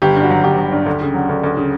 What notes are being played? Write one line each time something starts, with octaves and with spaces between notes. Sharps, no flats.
G1 G4
G2
F#4
F#3
G1 G4
G1
G2
D2
C#3
F#3
D2
D2
C#3